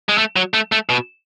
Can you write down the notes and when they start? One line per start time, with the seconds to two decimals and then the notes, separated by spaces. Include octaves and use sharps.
0.09 G#3
0.18 A3
0.36 F#3
0.54 A3
0.72 A3
0.89 B2